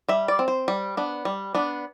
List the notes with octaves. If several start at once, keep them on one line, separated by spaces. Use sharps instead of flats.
G3 E5
D5
C4
C5
G3
B3 D4
G3
B3 D4